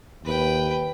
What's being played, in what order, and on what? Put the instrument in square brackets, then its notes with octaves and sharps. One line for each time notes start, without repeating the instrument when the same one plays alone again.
[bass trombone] D#2 [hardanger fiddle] B4 G5